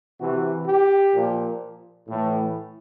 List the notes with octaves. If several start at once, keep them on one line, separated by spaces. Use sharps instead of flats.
C3 E3 F#4
G4
A#2 F3
A2 E3